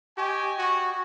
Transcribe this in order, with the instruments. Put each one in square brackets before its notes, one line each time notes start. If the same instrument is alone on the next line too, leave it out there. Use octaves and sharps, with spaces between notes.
[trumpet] G4 [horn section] D#5 G5 G#5 [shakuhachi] C#6
[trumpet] F#4 [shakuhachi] C#6